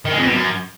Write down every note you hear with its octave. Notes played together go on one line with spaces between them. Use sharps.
D#3
G#3
F2
B2
F#2